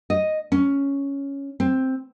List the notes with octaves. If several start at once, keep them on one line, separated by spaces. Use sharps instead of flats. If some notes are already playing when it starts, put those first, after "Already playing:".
D#5
C#4
C4